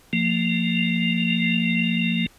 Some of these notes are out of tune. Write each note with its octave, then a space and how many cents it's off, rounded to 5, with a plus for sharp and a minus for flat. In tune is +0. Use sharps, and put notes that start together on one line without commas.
F3 +0 A#3 -30